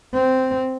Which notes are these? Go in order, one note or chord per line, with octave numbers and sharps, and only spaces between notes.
C4